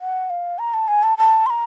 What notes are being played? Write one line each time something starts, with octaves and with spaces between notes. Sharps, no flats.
F#5
F5
A#5
A5
G#5
A5
A5
C6
A#5